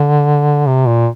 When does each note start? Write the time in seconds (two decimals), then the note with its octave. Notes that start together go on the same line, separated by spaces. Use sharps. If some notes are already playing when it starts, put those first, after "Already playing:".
Already playing: D3
0.66 C3
0.86 A#2